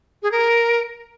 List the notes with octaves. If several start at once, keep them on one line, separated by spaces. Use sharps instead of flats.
G#4
A#4